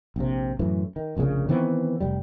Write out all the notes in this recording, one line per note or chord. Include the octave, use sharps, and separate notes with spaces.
A#1 C3
F#2 A2 E3
D#3
F1 A#1 A#2 C#3
D#3 E3 B3 C4
F1 F2 G3